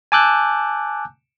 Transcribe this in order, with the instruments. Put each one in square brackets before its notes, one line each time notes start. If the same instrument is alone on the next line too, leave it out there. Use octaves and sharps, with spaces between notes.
[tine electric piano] G#5 A5 D6 E6 F#6 G6